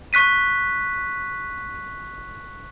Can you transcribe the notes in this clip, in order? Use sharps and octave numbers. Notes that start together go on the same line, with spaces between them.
C#6 F#6 B6 D#7